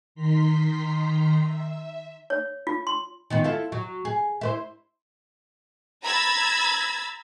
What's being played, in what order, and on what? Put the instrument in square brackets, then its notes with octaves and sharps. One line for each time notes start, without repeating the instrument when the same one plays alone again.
[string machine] D#3 A#5 C6 B6
E5
[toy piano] C#5
F4
C6
[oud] D#3 F3 B3
E4 F4 A4
F#3
G#4
E4 B4 C5
[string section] A#5 B5 E6 G#6 A6